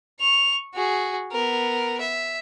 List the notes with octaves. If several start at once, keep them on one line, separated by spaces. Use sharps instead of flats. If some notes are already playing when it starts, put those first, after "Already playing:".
C#6 F7
F#4 G#4
B3 A#4
E5